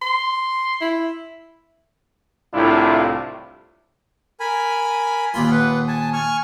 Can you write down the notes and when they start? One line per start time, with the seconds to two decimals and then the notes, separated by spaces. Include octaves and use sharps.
0.02 C6
0.81 E4
2.54 C2 A2 D4 E4 F4
4.40 A#4 G#5 B5
5.34 D#2 A#2 F4 B5 C6
5.51 B4 F#5
5.88 G#5 A5
6.13 G#5 C#6 F6